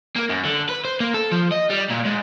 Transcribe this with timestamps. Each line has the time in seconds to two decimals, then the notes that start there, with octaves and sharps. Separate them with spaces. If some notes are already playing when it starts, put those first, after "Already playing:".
0.16 A#3
0.29 F#2
0.45 D3
0.69 B4
0.85 C5
1.00 A#3
1.14 A4
1.32 F3
1.51 D#5
1.70 G3
1.90 A#2
2.05 G#2